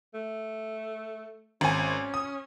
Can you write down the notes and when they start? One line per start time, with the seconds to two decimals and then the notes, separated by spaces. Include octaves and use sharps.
0.14 A3
1.61 G#1 C#4 G#5
2.14 D#6